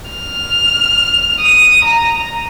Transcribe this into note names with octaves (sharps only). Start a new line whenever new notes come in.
F6
D#6
A#5